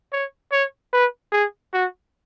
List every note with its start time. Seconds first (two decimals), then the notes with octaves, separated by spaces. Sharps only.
0.13 C#5
0.52 C#5
0.93 B4
1.32 G#4
1.73 F#4